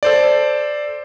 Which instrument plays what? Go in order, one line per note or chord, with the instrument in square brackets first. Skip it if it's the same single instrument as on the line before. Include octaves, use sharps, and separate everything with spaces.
[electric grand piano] A4 C5 D5